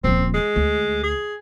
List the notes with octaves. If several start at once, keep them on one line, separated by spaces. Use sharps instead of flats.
D#1 F3 C4
G#3
D2
G#4